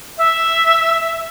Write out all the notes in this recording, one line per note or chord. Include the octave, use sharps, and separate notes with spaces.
E5